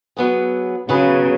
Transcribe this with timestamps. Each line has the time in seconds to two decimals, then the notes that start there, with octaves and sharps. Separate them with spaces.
0.17 F#3 B3 G#4 B4
0.89 C#3 F#3 B3 G#4 B4